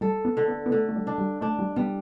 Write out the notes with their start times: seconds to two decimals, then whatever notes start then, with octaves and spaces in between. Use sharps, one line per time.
0.01 G3 A4
0.25 B3
0.37 D3
0.48 B3
0.66 B3
0.71 D3 A3
0.89 A3
0.96 G3
1.07 D4
1.18 G3
1.41 A3 D4
1.59 G3
1.76 G3 B3